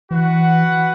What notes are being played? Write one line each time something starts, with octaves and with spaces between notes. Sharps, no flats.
E3 F#4 B4 F#5